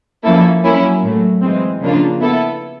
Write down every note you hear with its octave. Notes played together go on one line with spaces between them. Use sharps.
F3 A#3 C#4 E4 A4
F#3 A#3 C#4 E4
A2 F#3 A3
E3 G#3 C4
C#3 F3 A#3 D4 F4
B3 E4 A4